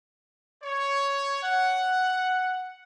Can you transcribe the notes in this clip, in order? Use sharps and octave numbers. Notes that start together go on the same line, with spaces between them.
C#5
F#5